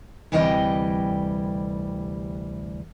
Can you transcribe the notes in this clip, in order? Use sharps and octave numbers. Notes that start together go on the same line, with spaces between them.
D2 C3 E3 G3 D#5 G5